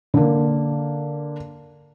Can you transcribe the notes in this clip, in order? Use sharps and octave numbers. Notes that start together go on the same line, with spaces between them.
D3 A#3